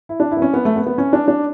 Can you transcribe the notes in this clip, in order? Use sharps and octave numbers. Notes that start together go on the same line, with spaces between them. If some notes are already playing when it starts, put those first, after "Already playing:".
E4
D4
E4
B3
C#4
B3
A3
B3
B3
C#4
D4
D4